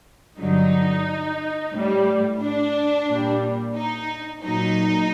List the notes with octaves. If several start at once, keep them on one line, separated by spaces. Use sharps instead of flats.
G2 D3 F#3 D#4
A2 G3
D4
A#2 G3
D#4
A#2 F#3 D#4